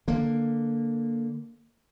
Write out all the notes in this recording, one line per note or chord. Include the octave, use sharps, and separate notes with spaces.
D3 A#3